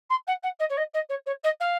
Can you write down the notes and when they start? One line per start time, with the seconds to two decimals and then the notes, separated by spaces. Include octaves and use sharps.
0.10 C6
0.27 F#5
0.43 F#5
0.59 D#5
0.69 C#5
0.77 D#5
0.93 D#5
1.09 C#5
1.26 C#5
1.43 D#5
1.60 F5